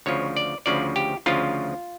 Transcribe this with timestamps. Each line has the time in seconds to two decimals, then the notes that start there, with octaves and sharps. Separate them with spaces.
0.06 D2 C#3 F3 C#5
0.37 D5
0.66 D2 C#3 F3 D5
0.96 G4
1.26 D2 C#3 F3 F4